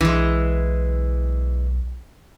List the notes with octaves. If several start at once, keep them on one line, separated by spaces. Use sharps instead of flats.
B1 E3 G#3